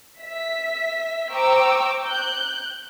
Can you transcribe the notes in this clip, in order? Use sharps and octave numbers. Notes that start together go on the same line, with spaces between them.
E5 B6
C5 G5 A#5 C#6 D6 E6
F#6 G6